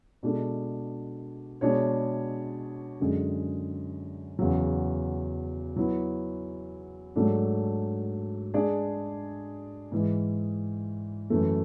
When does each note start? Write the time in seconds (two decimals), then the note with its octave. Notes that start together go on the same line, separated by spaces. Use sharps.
0.23 B2 G#3 D4 A4
1.61 B2 G#3 D4 G#4 C#5
3.00 F#2 D3 G#3
4.39 E2 C#3 F#3
5.76 F#3 B3 E4
7.16 G#2 F#3 A3 D4
8.54 G#3 D4 G#4 D5
9.92 G#2 E3 G#3
11.30 F#2 E3 A3